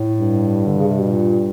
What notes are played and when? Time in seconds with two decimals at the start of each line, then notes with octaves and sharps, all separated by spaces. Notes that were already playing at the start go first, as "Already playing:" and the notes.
Already playing: A2
0.20 G2
0.66 D3
0.78 C#3
0.88 C3
0.99 B2
1.10 A#2